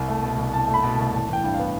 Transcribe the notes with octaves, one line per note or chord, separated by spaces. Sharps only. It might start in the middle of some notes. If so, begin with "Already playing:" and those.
Already playing: C2
A3
B2
C2
C2 A5
A3
B5
B2
C2 A5
A1 A5
E3 G5
G2 G5
F5
B3